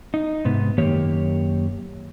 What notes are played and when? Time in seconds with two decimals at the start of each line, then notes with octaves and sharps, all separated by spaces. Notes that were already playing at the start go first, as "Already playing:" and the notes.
0.14 D#4
0.45 G#2 C3 B3
0.78 F#2 D#3 A#3 G4 C#5